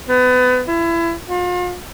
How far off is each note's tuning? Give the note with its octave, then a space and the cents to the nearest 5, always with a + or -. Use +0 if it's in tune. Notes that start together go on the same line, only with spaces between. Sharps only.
B3 +30
E4 +30
F4 +40